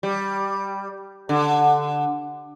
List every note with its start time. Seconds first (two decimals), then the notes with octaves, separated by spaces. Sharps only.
0.03 G3
1.29 D3